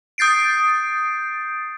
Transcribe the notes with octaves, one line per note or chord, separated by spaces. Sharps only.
D#6 G6 A6 C7 D7